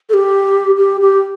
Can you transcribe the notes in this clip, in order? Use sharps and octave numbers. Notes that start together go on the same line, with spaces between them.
A4
G4
G4
G4